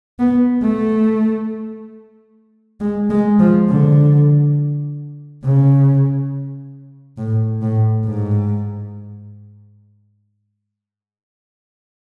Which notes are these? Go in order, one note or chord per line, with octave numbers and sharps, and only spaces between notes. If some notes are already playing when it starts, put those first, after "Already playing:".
B3
A3
G#3
G#3
F3
D3
C#3
A2
A2
G#2